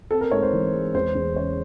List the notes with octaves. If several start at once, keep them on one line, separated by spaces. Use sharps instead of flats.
C4 A4
A#4
G#2 C#5
C5
E3
G#3
E2 C5
E2
C#3 C#5